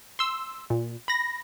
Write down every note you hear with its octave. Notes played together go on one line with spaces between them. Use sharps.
C6 E6
A#2
B5 A#6